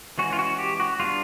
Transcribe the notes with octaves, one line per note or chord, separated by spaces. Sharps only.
E3 G#3 C#4 F#4
F4
F#4
G4
F#4
G3 B3 D4 F4